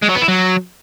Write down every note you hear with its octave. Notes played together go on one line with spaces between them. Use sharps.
G#3
F#3
B3
E4
F#3